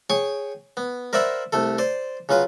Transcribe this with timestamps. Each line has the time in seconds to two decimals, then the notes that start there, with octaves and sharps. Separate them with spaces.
0.10 G#4 C#5 G5 C#6
0.77 B3
1.13 A#4 C5 D5 E5 F#5 B5
1.53 C2 A3 A4
1.78 C5 D5 C6
2.29 C#3 F#3 F4 B4